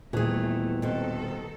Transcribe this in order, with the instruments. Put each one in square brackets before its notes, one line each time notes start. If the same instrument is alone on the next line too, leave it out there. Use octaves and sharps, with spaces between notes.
[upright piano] D#1 [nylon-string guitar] E3 G#4 [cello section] A3 [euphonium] B3
[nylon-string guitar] B2 C4 [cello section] D#3 A4